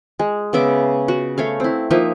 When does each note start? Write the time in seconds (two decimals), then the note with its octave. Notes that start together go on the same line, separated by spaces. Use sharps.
0.19 G#3
0.53 C#3 B3 E5 D6
1.08 F#4
1.38 A3 C#5 F5
1.60 C4 E4
1.90 F3 A#3 D#4 E5